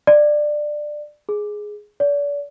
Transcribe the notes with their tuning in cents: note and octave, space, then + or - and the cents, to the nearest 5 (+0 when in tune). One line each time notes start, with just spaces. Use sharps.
D5 +15
G#4 +5
D5 -40